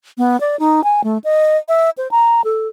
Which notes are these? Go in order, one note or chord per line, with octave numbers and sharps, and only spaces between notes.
B3
D5
D#4
G#5
A3
D#5
E5
C5
A#5
A4